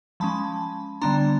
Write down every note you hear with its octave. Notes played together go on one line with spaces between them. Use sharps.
F3 G#3 C#4 A5 B5
D3 G3 B3 D4 A#5 C6